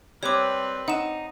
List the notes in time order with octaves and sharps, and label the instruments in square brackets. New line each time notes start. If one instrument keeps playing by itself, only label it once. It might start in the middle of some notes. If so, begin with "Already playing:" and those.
[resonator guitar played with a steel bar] G3 [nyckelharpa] C4 B4 [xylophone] C#5 D6
[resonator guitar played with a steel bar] D#4 [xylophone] F#5 E7